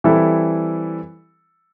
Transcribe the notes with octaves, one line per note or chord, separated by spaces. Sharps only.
E3 G3 C4 E4 A4